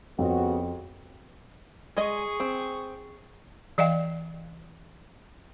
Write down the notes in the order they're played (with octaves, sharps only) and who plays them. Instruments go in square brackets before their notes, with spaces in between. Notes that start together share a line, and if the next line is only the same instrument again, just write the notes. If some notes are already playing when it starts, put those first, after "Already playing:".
[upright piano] F2 [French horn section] C#3 B3 F#4
[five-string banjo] G#3 D#5 [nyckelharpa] G#4 C#6
[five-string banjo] C4
[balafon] E3 D5 D#5 F5 G5